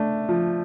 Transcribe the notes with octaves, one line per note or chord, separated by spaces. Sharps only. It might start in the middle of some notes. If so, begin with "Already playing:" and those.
Already playing: A3 D4
F3